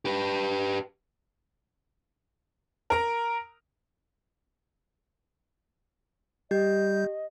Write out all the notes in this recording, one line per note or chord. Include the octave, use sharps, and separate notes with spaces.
G4 B4
A#4 A#5
G3 G4 D#5 G6